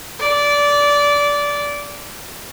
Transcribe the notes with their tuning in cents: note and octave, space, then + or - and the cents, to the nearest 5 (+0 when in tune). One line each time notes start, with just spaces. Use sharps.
D5 -20